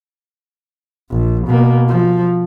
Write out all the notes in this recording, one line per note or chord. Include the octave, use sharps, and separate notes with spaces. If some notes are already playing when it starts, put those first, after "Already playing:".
A#1
B2 A#3
F3